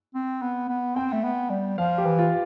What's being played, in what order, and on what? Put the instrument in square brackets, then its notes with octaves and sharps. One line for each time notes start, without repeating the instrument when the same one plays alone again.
[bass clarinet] C4
B3
B3
[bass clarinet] C4 [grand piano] G5
[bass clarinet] A3
B3
G3
[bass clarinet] F3 [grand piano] F5
[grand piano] G4
[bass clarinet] E3
[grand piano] F4